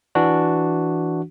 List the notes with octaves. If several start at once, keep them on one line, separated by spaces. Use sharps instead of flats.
E3 D4 F#4